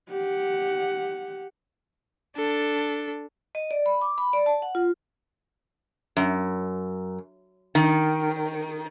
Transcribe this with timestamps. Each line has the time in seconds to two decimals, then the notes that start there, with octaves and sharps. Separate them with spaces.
0.10 G4 F#5
2.36 D4 A4
3.55 D#5
3.71 D5
3.86 B5
4.02 D6
4.18 B5
4.33 D5
4.46 A5
4.62 F#5
4.75 F4
6.17 F#2
7.75 D#3